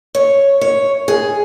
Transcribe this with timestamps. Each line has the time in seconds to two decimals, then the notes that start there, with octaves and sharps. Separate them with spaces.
0.15 C#5
0.61 C#5
1.08 G#4